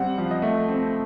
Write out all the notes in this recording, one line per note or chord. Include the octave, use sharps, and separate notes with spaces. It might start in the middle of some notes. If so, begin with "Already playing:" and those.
Already playing: G3 C4 F#5
F3 F5
D#5
A3
C4